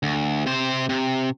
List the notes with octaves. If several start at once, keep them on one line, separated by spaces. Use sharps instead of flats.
D2
C3 C5
C3